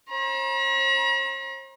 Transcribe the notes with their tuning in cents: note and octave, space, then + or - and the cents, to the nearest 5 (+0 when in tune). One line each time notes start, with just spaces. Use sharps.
C5 +45 A#5 +45